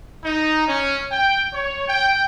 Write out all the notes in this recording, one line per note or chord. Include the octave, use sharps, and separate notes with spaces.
D#4
C#4
G5
C#5
G5